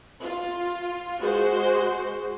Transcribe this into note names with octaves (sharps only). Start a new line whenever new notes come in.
F4
G#3 F#4 C5